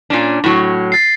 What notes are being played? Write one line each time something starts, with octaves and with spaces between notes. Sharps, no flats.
A#2 C#4 D4
A2 F#3
A6 C7